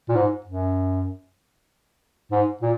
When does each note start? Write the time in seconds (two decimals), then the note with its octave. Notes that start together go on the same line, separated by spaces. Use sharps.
0.09 A#2
0.15 G#2
0.46 F#2
2.31 G#2
2.62 A#2